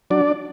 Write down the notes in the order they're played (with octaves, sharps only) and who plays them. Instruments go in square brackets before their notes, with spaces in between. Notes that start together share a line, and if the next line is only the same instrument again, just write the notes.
[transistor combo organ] F#3 D4 D5